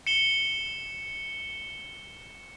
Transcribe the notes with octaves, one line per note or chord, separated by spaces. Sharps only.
C#7 E7 G7